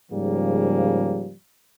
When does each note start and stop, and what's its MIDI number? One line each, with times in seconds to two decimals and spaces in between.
0.11 1.34 44
0.11 1.34 49
0.11 1.34 53
0.11 1.34 55
0.11 1.34 58